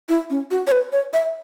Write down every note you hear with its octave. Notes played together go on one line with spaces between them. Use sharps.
E4
C#4
F#4
C#5
B4
C#5
E5